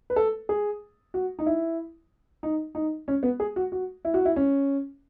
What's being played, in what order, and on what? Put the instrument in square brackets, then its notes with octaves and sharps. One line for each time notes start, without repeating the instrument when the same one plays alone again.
[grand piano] B4
A4
G#4
F#4
D#4
E4
D#4
D#4
C#4
B3
G#4
F#4
F#4
E4
F#4
E4
C#4